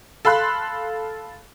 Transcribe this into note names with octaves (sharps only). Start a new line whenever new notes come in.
A4 F5 B5 C6 F#6